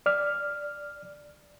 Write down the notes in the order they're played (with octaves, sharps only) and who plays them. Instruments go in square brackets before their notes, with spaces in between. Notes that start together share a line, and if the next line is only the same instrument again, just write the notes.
[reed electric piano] D5 F6